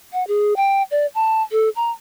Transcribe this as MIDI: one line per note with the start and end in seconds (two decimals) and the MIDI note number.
0.13 0.26 78
0.28 0.54 68
0.56 0.83 79
0.91 1.06 74
1.15 1.42 81
1.52 1.69 69
1.76 1.91 82